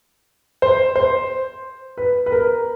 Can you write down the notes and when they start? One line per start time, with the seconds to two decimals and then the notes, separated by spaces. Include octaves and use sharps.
0.62 C5
0.96 C5
1.98 B4
2.26 B4
2.32 A#4